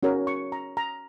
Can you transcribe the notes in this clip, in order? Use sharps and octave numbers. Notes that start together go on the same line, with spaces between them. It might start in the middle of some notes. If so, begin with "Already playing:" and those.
C#4 F#4 A#4 C#5
C#6
A#5
A#5